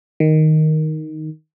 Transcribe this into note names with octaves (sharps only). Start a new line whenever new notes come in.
D#3